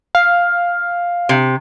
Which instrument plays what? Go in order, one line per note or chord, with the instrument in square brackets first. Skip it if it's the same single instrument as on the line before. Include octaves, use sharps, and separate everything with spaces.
[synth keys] F5
[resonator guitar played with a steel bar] C3